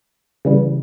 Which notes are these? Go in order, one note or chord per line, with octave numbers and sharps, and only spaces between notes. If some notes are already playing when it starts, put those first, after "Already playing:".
C#3 E3 G3